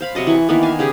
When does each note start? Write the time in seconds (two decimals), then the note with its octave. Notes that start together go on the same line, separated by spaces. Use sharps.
0.01 C5 F5 B5
0.15 C3 F#3 D#5 A5
0.27 E3 C#6
0.49 D#3 E3 A#3 B3
0.63 F5 G#5 A5
0.79 C#3 G4 G#4 G5